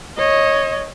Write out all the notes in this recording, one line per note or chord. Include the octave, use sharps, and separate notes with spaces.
C#5 D#5